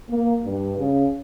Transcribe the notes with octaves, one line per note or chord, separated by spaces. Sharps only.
A#3
G2
C#3